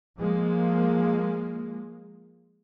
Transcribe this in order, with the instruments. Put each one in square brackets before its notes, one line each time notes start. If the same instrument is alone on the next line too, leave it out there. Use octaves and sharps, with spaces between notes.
[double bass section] F3 G#3 A#3